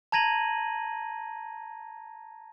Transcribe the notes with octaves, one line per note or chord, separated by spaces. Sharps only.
A5 A#5 G#6 A#6 D#7 F#7